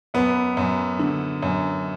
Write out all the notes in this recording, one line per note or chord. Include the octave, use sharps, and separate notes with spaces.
F#2 B3
F#2
D3
F#2